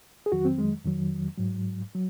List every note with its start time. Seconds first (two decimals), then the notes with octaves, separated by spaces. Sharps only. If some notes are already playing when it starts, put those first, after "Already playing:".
0.26 G#4
0.32 F2 D#3 F#3 F#4
0.45 C4
0.58 G#3
0.85 F2 D#3 F#3
1.38 G#2 F#3
1.95 F#3